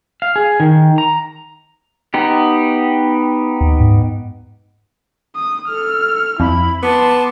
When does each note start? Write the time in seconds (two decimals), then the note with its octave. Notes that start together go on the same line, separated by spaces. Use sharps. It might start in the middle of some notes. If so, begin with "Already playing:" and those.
0.22 F5
0.36 G#4
0.60 D#3
0.98 A#5
2.14 B3 D#4 G4
3.61 D#2
3.80 G#2
5.36 D#6
5.68 A4 F6
6.40 F2 E4 B5
6.83 B3 A5 C6 D6